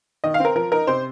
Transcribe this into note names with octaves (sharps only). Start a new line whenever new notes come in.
D#3 D#5
F5
C4 A#4
F3 A#4
D#4 A#4
C3 C5